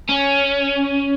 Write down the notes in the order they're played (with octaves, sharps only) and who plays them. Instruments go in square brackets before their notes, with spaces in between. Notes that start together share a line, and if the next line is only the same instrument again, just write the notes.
[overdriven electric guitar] C#4